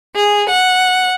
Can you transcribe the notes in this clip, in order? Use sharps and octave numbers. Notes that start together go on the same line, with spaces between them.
G#4
F#5